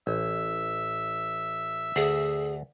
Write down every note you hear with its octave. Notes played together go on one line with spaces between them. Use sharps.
A1 E5
D2 G#4